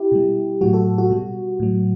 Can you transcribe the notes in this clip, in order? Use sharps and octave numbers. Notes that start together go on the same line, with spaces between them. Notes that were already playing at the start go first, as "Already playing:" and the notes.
Already playing: E4 G4
B2 G3
A2 F#3 F#4
F#4 A4
F#4
B2 G3
A2 F#3